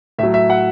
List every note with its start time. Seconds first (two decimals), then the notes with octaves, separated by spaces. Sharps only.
0.18 A2 E5
0.23 F#3
0.34 E5
0.50 F#5